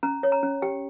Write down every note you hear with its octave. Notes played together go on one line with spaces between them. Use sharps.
C#4 A#5
C#5
A#5
C#4
G4 G5